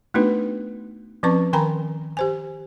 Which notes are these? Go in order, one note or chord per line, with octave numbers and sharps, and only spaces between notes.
A3 B3 D4 D#4 F#4 B4
F3 C4 C#4 B4 C#6
D#3 A#4 G5 G#5 A#5 B5
G4 C5 G#5